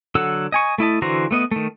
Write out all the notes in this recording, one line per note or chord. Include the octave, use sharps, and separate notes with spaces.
D3 F#3 A4 F#5 E6
D#5 G#5 C#6
A3 E4 D#5 A5
D3 E3 F#4 C5 A#5
A3 B3 D#5
D#3 A3